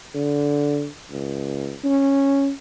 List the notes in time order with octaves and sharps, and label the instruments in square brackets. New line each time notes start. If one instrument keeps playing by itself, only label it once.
[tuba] D3
C#2
C#4